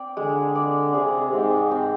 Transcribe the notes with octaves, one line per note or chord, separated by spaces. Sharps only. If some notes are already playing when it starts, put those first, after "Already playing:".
Already playing: C4 D5
D3 G#3
D5
C3 G#4
G#2 C4
C4